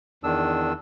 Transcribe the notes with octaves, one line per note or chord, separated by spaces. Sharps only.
E2 D#3 D4 E6